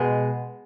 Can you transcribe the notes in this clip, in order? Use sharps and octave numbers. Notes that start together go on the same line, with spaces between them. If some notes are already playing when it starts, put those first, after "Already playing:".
Already playing: B2 G#3